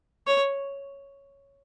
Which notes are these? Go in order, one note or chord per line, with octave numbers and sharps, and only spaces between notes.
C#5